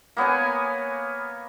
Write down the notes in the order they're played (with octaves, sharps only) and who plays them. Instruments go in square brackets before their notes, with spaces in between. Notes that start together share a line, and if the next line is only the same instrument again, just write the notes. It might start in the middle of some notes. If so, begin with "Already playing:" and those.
[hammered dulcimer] A#3 B3 C#5 G#5